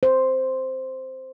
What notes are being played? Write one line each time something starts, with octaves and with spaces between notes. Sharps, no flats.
C5